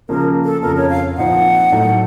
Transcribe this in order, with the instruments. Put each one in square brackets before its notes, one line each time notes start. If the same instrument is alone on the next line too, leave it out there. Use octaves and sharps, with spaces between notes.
[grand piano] C#3 F3 A#3 [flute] A#4
[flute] A4
[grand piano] F2 C#3 F3 [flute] A#4
[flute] C#5
F5
[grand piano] A#2 F3 C4 D#4 [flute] F#5
[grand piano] A2 F#3 A3 D#4